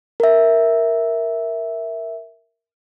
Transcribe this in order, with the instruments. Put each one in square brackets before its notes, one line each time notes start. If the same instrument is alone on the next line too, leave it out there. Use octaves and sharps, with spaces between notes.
[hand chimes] A#4 E5